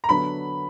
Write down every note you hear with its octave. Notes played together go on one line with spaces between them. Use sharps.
A#5
D3 F#3 B3 D4 B5